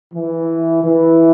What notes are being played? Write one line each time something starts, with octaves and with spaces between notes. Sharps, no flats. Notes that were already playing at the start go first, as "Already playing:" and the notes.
E3
E3